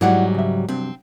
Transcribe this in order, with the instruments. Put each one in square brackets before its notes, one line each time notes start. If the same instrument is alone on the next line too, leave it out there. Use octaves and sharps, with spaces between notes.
[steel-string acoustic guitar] G#2 F#3 G3 [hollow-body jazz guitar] E4 D5 F#5
[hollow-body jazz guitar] C#3 E5
[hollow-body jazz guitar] G2 C3 F#3 [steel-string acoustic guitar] C4